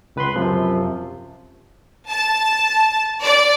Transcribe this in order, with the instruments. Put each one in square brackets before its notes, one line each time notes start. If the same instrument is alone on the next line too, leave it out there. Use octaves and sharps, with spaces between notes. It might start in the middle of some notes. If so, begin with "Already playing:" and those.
[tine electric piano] C#2 B4 B5 C6
F#2 C3 F3
[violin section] A5
D5